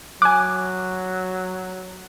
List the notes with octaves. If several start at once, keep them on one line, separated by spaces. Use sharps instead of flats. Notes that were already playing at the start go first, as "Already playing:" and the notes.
F#3 G#5 D6 F#6